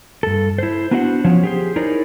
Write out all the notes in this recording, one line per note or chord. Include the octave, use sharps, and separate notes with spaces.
G2 A4
E4 C5
B3 D4 F#4 C5 F5 F#5
F3 F#3 C#4 C5 C#5
G4 G#4 C5
D#4 E4 G#4 A#4 C#5 D5